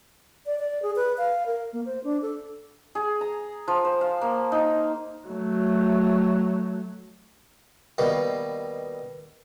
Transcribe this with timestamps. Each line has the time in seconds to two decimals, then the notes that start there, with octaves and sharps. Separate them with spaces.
0.46 D5
0.59 D5
0.82 G#4
0.96 B4
1.18 F5
1.46 A#4
1.73 A#3
1.86 C5
2.04 D4
2.22 A4
2.95 G#4
3.21 A#5
3.68 F3
3.85 C5
4.01 F5
4.21 A#3
4.52 D#4
5.27 F#3 A3
7.98 D#2 B2 G3